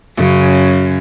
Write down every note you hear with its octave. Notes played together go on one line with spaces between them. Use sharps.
F#2 C#3